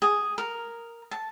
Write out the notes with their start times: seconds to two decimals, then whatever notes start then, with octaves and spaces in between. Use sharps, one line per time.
0.02 G#4
0.38 A#4
1.11 A5